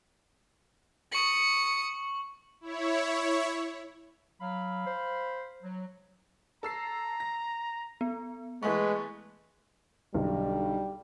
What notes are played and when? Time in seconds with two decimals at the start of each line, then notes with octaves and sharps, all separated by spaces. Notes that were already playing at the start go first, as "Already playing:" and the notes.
1.12 C#6 D#6 C#7 F#7
2.61 E4 C#5
4.41 F#3 F5 B5
4.86 C5
5.62 F#3
6.63 A4 A#5 E6 C7
7.20 A#6
8.01 B3
8.63 E3 G#3 A3 B3 B4 C#6
10.15 B1 D3 G3